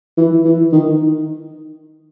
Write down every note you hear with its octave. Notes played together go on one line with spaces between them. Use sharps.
E3
E3
D#3